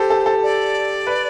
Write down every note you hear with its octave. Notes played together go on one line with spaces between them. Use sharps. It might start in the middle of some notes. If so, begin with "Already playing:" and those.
Already playing: G4 A4 C5
A4
A4
D5
B4